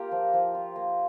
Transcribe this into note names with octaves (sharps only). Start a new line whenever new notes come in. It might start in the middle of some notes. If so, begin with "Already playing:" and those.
Already playing: A#3 F4 G4 A#4
F3
F3
F4
A#3